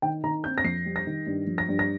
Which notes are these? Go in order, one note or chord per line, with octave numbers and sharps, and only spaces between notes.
D#3 G5
D#3 A#5
C4 G6
A#6
F2 C7
G3
A#6
D#3
G2
F3
A#6
G2
A#6